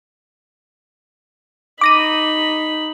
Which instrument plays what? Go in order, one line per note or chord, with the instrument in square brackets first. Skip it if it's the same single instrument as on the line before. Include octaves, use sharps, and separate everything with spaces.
[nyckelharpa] D#4 B5 [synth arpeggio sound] D6 A#6 D#7